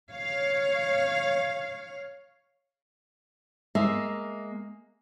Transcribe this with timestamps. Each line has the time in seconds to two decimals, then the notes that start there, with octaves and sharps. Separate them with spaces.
0.11 C#5 F5
3.75 G#3 A#3 E5